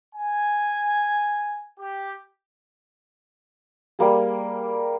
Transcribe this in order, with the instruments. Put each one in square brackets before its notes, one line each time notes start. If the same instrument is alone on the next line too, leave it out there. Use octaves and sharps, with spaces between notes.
[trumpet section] G#5
G4
[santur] G3 A#3 G#4